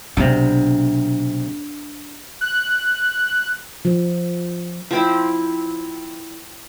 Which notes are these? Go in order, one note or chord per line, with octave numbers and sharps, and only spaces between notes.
B1 C3 D4
F#6
F3
F3 C4 E4